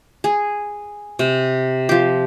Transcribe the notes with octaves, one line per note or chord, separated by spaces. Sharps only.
G#4
C3
F3 G4